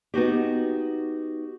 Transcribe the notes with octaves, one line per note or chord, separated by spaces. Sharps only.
B3 D#4 F#4 G4